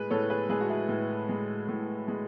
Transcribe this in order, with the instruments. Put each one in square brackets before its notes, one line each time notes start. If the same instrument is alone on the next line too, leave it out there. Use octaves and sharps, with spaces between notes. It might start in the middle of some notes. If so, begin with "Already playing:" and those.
Already playing: [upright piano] A2 G#3 G#4 B4
A2 A4 C#5
G#4 B4
G#3 G#4 B4
F#4
E4 G#4
A2
G#3
A2
G#3